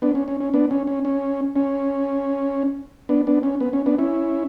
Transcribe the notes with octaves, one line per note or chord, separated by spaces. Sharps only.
B3 D4
C#4
C#4
C#4
B3 D4
C#4
C#4
C#4
C#4
B3 D4
B3 D4
C#4
B3
C#4
B3 D4
C#4 E4